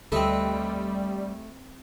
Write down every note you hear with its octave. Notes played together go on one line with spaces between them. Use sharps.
D2 G3 A3 C4 A4 B4 D#5